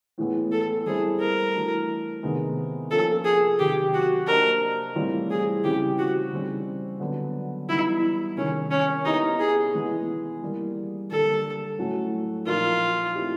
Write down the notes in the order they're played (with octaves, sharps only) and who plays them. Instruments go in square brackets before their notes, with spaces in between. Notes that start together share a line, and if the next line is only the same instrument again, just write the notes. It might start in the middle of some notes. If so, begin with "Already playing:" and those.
[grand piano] A2 E3 G#3 B3
[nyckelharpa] A4
[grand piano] G3 C4 E4 A4 C5 [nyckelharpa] G#4
[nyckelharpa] A#4
[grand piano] E3 A3 D4 F#4
C3 D#3 G#3 B3 D#4
[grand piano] F3 A#3 C#4 F4 A#4 [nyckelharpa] A4
[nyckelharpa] G#4
[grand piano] C3 D#3 F#3 [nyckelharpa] G4
[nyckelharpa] F#4
[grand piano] A#3 D4 G4 C5 D#5 [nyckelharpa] A#4
[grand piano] A2 E3 G3 C4 F4
[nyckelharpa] G#4
[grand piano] C#3 E3 G3 C4 E4 [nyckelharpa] G4
[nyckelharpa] F#4
[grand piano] C#3 E3 G3 C4 D#4
D3 F#3 B3
[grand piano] E3 G3 B3 D#4 [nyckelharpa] E4
[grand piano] C3 D#3 G#3 [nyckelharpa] C#4
[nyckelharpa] C#4
[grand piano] B3 E4 G4 [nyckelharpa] D#4
[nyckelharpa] G#4
[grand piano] E3 G#3 B3
E3 G3 A#3
[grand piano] D3 G3 A#3 D4 [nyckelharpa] A4
[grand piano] A2 F#3 A3 C#4 F#4
[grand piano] A#2 F3 A#3 D#4 [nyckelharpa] F4
[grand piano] A3 C4 E4 G4